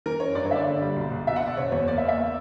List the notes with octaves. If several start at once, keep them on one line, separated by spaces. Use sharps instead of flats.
E3 A#4
F#2 C#5
G2 D5
C#5
D3 E5
D5
D3
G3
B1
B1
B2 E5
F#5
B1
D5
F#1 C#5
E2 C#5
A#3 D5
E5
A#3
E5
B3